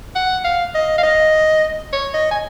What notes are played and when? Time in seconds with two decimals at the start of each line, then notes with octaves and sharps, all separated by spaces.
0.15 F#5
0.44 F5
0.74 D#5
0.98 F5
1.03 D#5
1.93 C#5
2.14 D#5
2.31 G#5